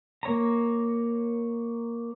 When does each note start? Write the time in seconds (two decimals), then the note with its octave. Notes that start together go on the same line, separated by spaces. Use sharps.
0.23 A#3 C#5 A#5